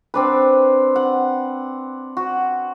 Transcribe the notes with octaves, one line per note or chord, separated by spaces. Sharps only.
C4 D4 B4
F#5
F#4